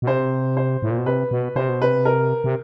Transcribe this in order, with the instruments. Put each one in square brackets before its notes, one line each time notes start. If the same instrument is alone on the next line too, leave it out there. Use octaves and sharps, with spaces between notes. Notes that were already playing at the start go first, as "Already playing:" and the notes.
[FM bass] B2
[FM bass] C3 [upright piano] C5
[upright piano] C5
[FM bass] A2
A#2
B2
[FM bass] C3 [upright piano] B4
[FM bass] B2
[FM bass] C3 [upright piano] C5
[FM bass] B2
[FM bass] C3 [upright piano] B4
[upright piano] A#4
[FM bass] C3